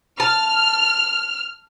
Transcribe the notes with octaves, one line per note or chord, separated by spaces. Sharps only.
A5 F6